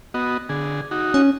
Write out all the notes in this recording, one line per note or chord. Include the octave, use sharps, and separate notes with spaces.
B3 F#4 D#5
D3 G#4
D#4 F#4
C#4